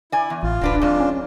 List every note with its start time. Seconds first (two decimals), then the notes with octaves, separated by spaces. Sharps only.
0.12 E4 D5 G#5
0.30 E2
0.43 A1 F4
0.61 D1 F#3 D4 B4
0.82 F2 G#2 D4 F4
1.00 C#4